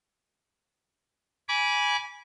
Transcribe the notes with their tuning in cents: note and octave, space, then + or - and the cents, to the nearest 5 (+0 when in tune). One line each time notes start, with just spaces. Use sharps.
G#5 +0 B5 -20 D6 -25